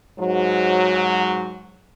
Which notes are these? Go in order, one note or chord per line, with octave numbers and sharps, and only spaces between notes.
G#2 F#3